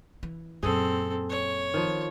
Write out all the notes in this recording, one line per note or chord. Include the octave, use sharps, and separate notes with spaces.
E3
F#2 A#2 C4 G#4 A4
C#5
D#3 F3